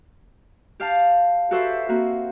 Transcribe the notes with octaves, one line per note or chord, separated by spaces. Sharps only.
G4 F5 A5
F#4 G4 A4 B4 C5 E5
A#3 C4 F#4